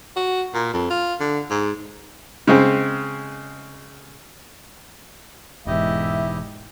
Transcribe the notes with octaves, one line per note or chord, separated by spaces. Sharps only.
F#4
A#2
F2
F4
D3
G#2
C#3 G#3 C4
E1 E2 G#2 E4 G4 D#5 E5